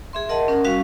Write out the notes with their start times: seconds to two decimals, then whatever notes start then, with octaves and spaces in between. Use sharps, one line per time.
0.13 G#4 E5 C6
0.29 A#4 D#5 F#5 A5 C6
0.48 C#4 A#4 F#5
0.64 G3 C#4 F#4 F5 C#6